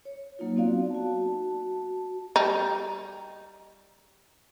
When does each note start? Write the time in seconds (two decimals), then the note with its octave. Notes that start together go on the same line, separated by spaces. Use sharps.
0.05 C#5
0.39 F#3 A#3 D#4 F4
0.56 B3 C4 D#4 F#4 D5 F5
0.90 F#4 A5
2.36 G3 D#4